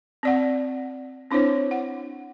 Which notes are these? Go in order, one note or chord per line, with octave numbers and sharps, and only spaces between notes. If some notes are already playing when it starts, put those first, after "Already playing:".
C4 D5 F#5
C4 D4 E4 C5 C#5
F#5